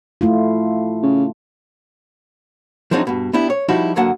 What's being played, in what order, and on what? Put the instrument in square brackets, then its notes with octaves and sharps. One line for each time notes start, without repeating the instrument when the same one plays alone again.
[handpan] A3 E4 F4
[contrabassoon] C#3
[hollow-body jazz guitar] F3 F#3 G#3 C4 D4 D#4
G2 B2
B3 D4 E4 G4
C#5
F3 G3 D#4 E4 F#4
F#2 D3 F#3 A#3 F#5 A5